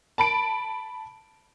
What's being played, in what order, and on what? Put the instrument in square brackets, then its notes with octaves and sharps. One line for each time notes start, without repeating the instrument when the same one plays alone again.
[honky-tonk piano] A5 B5 D7